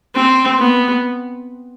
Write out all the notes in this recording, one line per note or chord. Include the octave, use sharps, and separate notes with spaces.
C4
B3